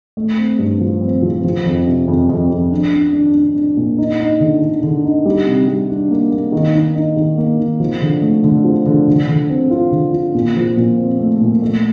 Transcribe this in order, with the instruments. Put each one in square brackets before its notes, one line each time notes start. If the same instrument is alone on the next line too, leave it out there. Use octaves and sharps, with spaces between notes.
[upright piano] A3
C4
G2
F3
C4
F3
F3
F2
C3
F2
F2
F2
D4
D4
D4
D4
D4
A#2
D#4
D#4
D3
D3
D3
D#4
G3
C3
G3
D4
A#3
A#3
D#3
D#3
D#4
D#3
A#3
D#3
F3
D3
A3
D3
F3
D3
D3
D3
C4
F4
D3
F4
A#2
F3
A#2
C4
A3
A#2
A3